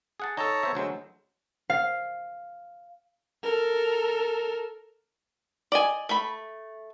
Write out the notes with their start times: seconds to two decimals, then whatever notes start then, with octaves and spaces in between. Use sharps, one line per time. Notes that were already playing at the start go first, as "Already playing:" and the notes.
0.20 G#4 F#5 A5
0.37 D#4 A4 C#5 A5 A#5
0.63 B3 C5 E5
0.75 D2 F#3 G#3 C5 E6
1.70 F5
3.43 A4 A#4
5.72 D5 D#5 G#5
6.09 A3 B5